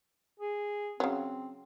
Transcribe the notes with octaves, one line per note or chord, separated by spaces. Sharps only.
G#4
C#3 F#3 C4